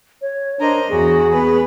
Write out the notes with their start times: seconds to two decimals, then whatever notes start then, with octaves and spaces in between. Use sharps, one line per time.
0.22 C#5
0.59 D4 A#4 C5 D#5
0.89 E2 F#4 G#4
1.31 B3 B4